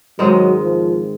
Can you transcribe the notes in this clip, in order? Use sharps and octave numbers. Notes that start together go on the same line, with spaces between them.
G#2 D#3 F#3 G#3 C4
F3